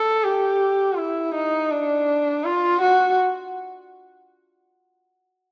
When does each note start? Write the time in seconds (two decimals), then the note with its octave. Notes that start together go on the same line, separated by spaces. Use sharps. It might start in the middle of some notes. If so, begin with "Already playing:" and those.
Already playing: A4
0.24 G4
0.97 E4
1.34 D#4
1.71 D4
2.45 F4
2.81 F#4